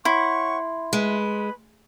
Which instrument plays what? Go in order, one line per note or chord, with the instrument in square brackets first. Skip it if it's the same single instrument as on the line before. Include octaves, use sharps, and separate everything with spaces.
[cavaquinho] E4 [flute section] C#5 F#5 C#6 [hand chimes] C6
[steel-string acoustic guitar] G#3 [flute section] B4 B5